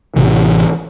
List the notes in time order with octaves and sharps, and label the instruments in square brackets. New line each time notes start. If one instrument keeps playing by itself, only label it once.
[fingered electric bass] A1 C3 E3